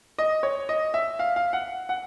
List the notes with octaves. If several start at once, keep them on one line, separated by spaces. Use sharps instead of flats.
D#5
C#5
D#5
E5
F5
F5
F#5
F#5